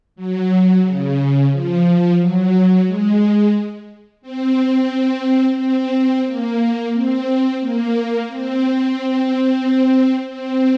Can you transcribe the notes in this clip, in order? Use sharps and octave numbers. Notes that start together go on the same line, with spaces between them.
F#3
C#3
F3
F#3
G#3
C4
C4
A#3
C4
A#3
C4
C4